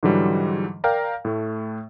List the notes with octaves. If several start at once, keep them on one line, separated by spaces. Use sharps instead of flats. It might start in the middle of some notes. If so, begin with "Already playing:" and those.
G#2 D3 E3 F#3 G3
A#4 D5 F5 G5 A#5
A2 A3